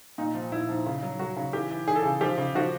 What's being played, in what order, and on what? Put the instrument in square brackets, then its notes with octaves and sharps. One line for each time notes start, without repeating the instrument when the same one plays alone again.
[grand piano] A#2 D#4
F3
A#2 E4
F3
C#3
F#3
F#3 F#4
C#3
E3 G4
E3
E3 G#4
A4
C#3 G#4
F3 G4
C#3
F3 F#4